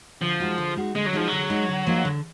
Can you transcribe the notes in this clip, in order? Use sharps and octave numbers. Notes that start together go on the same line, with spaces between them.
D3 F3
G#3 D#4 F#4
D3
G#3 D#4 F#4
D3 G#3
F#3
F3 G#3 D#4 F#4
D3 F#3
G#3 D#4 F#4
D3
F3 A#3 D#4 F#4
D3